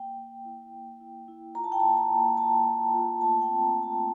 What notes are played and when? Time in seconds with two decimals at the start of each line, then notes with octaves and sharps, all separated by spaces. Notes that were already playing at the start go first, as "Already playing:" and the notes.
Already playing: A#3 G5
0.17 A#3
0.45 E4
0.73 A#3
1.01 E4
1.28 E4
1.55 F4 A#5
1.64 A5
1.72 G5
1.80 A5
1.83 A#3
1.97 A#5
2.11 A#3
2.37 A#3 A5
2.65 A#3
2.93 F4
3.20 A3 A5
3.41 G5
3.48 C4
3.62 A#5
3.75 A3
3.83 A5